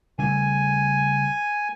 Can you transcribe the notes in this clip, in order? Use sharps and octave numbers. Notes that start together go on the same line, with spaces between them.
C#3 G3 A3 G#5